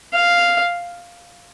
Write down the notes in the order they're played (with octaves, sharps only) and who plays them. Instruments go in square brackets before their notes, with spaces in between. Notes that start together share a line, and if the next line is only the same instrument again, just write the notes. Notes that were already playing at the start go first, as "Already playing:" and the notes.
[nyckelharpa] F5